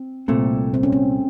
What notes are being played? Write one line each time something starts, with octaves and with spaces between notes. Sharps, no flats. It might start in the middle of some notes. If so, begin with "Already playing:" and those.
Already playing: C4
C2 A#2 A3 C4
C4
C#4
C4